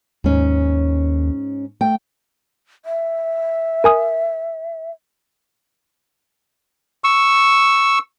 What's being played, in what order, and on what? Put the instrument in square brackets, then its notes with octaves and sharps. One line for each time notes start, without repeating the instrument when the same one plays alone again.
[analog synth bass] D#2 [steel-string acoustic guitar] G#2 C#4
[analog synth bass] A3 [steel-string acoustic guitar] G5
[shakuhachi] E5
[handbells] A#4 G#5 D#6
[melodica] C#6 E6